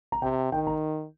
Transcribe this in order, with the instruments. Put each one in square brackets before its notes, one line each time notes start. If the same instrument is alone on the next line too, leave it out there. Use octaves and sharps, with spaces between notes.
[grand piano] A#5
[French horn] C3 [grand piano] G5
[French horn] D#3 [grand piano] G5
[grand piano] A#5